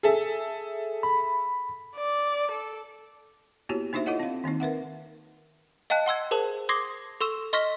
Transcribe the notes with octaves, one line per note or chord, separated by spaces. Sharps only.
G#4 A4 E5
B5
D5
A4
A#3 B3 E4 F#4 G4 C#5
A#3 D4 D#4 F#4 C5 E5
E4 F4 A4 C#5 D#5 F#5
C4 F5
D#3 A#3 C4 D#4
A#4 B4 E5 F#5
D#5 F5 G5 A5 F#6
F#5 C6 E6 G#6
G#4 A#4 C5 A5
C6 D6 D#6 G#6 A#6 C7
A4 C6 C#6 E6 E7
D#5 C6 C#6 F6 A#6 B6